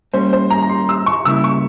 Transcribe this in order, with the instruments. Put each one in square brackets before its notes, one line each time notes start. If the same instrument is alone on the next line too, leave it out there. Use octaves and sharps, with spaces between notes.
[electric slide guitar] G3 A#3 C#4 [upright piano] C5
[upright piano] C5
A#5
A#5
C6
E6
C#6
[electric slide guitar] C#3 G3 A#3 E4 [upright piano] E6
[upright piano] C#6